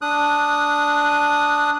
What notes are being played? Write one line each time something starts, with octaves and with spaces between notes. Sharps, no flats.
D4 D#6 F#6